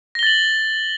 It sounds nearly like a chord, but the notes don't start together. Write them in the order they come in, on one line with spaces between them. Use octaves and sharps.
A#6 G7 A6 F#7